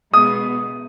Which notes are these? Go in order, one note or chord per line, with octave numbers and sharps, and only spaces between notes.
B2 G#3 B3 D#6